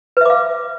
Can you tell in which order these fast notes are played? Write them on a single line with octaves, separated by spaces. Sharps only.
B4 E5 D6 F5